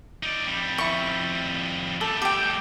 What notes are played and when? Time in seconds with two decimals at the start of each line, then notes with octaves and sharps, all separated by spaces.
0.23 D#4 D5
0.47 F2 G3
0.78 E4 C#6
2.01 G3 A3 A4
2.22 G4 G5